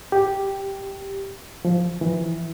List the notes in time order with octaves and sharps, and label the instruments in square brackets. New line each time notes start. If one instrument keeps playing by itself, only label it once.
[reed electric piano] G4
F3
E3